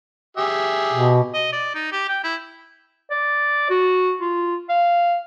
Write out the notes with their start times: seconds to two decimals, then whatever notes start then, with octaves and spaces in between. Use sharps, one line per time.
0.37 G4 G#4 E5
0.93 B2
1.34 D#5
1.53 D5
1.75 D#4
1.92 G4
2.09 G5
2.24 E4
3.11 D5
3.70 F#4
4.21 F4
4.69 F5